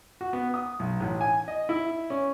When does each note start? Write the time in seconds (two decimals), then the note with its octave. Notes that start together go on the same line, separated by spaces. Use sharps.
0.21 F#4
0.33 B3
0.54 D#6
0.79 B1
1.00 A1
1.21 G#5
1.48 D#5
1.69 E4
2.10 C#4